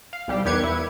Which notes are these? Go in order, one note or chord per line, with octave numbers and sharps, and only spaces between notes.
F5
C2 G3 G4
E2 D#3 G4 B4 G#6 C#7
E4